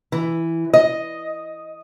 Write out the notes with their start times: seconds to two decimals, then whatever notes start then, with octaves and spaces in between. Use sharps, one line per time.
0.12 E3
0.73 D#5